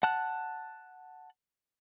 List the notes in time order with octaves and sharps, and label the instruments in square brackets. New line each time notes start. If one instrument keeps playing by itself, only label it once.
[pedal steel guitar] F#5 A5 F#6